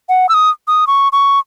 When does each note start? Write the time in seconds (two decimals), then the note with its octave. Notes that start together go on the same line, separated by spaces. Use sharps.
0.09 F#5
0.29 E6
0.34 D#6
0.68 D#6
0.87 C#6
1.12 C#6